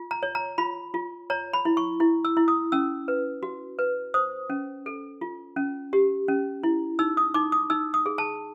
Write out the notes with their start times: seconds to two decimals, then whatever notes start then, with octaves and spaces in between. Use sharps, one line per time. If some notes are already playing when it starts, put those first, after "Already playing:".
Already playing: F4
0.11 A#5
0.23 C#5
0.35 A#5
0.58 F4 B5
0.94 F4
1.30 C#5 A#5
1.53 B5
1.65 E4
1.77 C#6
2.00 E4
2.25 E6
2.37 E4
2.48 D#6
2.72 C#4 E6
3.08 B4
3.43 F#4
3.79 B4
4.14 C5 D#6
4.50 C#4
4.86 A4
5.21 F4
5.56 C#4
5.93 G4
6.28 C#4
6.63 E4
6.99 D#4 E6
7.17 D#6
7.34 D#4 D6
7.52 D#6
7.70 D#4 E6
7.94 D#6
8.06 G#4
8.18 A5